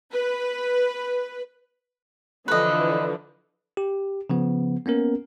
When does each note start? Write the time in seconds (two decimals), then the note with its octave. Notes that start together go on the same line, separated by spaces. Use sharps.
0.13 B4
2.48 D3 E3 F3 B4 D#5
3.77 G4
4.30 C#3 F3 B3
4.86 A#3 B3 C#4 A#4